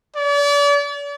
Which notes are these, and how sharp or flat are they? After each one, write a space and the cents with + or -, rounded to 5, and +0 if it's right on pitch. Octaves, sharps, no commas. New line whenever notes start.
D5 -40